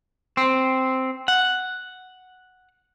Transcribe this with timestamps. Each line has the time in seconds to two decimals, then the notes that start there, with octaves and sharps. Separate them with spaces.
0.37 C4
1.28 F#5